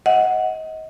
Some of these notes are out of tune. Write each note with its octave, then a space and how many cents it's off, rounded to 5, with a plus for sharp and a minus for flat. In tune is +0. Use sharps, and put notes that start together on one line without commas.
D#5 +30 F#5 +0